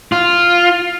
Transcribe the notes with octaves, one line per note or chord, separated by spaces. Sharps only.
F4